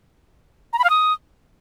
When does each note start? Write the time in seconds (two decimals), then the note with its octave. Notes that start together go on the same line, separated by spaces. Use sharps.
0.73 A#5
0.79 B5
0.84 F5
0.90 D#6